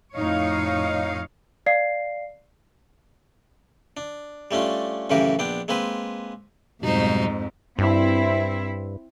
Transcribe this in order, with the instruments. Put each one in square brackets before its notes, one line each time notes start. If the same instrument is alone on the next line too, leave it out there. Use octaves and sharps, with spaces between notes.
[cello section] F2 A2 D#4 C#5 F5
[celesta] D5 F5 C7
[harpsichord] D4
G3 A3 C#4 D4 F4
F#2 A2 C#3 E3 G4 A#4
A#1 B3 D4 G5
G#3 A#3 C4 G#4 B4
[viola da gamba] F2 G#2 [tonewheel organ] B2 F#3 G3 [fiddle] D#4 C5
[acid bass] G2 [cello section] C4 E4 E5